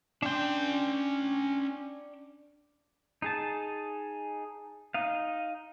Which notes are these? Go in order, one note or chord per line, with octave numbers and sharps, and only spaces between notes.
C#4 D4 G5 C6
D#4 G#4 A5
D#4 D#5 F5